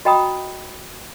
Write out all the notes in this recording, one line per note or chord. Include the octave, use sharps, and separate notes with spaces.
F#4 D#5 G5 A#5 B5 D#6